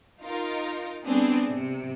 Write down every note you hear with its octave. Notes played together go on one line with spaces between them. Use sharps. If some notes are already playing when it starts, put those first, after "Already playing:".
D#4 F4 A#4
G3 B3 C4 D4 G#4
C3